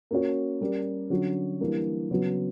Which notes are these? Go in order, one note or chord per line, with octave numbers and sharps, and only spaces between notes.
A#3 C#4 F#4 C#5
G3 C#4 G4 A#4 D5
D3 F#3 C#4 F#4
E3 G3 A#3 D4
C#3 F#3 B3 F#4